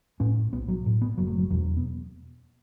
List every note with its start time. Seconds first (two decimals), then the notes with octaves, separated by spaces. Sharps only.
0.20 A2 C#4
0.53 B1 B3
0.68 F#3
0.86 A2
1.02 B3
1.18 F#1 F#3
1.27 A3
1.38 F#3
1.50 E2 B2 F#3
1.77 B3